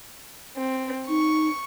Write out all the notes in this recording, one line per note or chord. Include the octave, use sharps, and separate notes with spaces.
C4
D#4 C#6